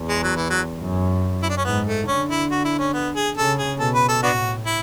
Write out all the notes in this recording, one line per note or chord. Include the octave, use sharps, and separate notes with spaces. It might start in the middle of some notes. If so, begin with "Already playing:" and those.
Already playing: E2
G#3
F#3
E3
F#3
F#2
E4
D4
C#4
G#2 B3
A3
D3 C#4
E4
F#4
E4
C#4
B3
G#4
C#3 A4
G#4
B2 A4
B4
A4
A2 B3 D4 F#4
E4